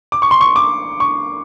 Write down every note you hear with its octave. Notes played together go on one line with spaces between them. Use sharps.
D6
C#6
C6
C#6
D6
C#6